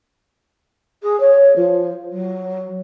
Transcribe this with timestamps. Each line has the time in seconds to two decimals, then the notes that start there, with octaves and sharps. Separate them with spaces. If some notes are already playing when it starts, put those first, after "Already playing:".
1.02 G#4
1.20 C#5
1.55 F3
2.11 F#3